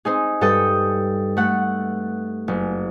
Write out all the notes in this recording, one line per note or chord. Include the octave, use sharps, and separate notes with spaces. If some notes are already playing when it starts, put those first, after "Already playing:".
C4 D#4 G#4
G2 A4 G5 D#6 G6
A3 F#5
F#1